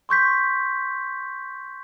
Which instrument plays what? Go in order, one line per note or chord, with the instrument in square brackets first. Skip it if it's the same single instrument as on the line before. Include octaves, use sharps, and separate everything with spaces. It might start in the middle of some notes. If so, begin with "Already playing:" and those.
[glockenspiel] C6 C#6 G6 B6